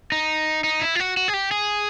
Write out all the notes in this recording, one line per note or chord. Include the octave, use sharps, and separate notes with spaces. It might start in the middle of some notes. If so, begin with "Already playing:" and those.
D#4
D#4
E4
F4
F#4
F#4
G#4
G4
G#4